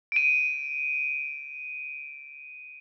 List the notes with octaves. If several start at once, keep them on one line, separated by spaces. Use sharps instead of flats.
D7 D#7